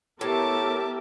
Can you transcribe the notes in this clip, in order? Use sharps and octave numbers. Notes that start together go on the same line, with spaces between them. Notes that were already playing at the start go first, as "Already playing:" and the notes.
A2 B3 G4 A#4 E5 A5 D6